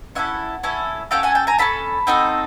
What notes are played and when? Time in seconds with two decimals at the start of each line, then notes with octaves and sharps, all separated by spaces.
0.15 C#4 E4 A4 E5 F#5
0.63 C#4 E4 A4
1.11 C#4 F#4 A4 F5 G5
1.23 F#5 G#5
1.35 G5 A5
1.47 G#5 A#5
1.58 C#4 F4 A4 A5 B5
2.07 C4 D#4 F#4 A4